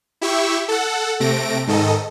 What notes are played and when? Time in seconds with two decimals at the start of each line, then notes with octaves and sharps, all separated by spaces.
0.21 E4 G4 E5 C#6
0.68 A4 F#5
1.20 C3 A3 A#6 D7
1.67 G#2 D#3 A4 D#5